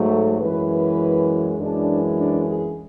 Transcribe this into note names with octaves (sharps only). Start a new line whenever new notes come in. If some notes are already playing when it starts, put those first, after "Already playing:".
Already playing: G#2 F#3 A3
A4
F#2 E3 G#3 B4
B4
F#2 E3 G#3 D4
D4
G#4